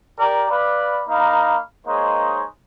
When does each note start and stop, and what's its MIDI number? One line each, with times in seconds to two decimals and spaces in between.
0.19 0.46 67
0.19 0.46 70
0.19 0.46 74
0.19 0.46 82
0.50 1.03 71
0.50 1.03 74
0.50 1.03 77
0.50 1.03 83
1.08 1.58 58
1.08 1.58 63
1.08 1.58 77
1.08 1.58 82
1.08 1.58 83
1.86 2.44 56
1.86 2.44 58
1.86 2.44 63
1.86 2.44 72
1.86 2.44 73